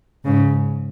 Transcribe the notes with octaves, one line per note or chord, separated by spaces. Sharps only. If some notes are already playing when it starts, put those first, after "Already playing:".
G#2 C#3